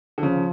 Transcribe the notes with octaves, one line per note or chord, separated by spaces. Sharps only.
D3
C#3 F3